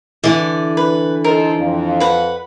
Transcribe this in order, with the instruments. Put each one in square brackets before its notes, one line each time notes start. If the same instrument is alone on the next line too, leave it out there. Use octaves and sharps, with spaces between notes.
[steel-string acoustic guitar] D3 E3 [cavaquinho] D5
[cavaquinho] B4
[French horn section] D#4 A4 C5 [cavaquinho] A#4
[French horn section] F2
[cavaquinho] B4 F#5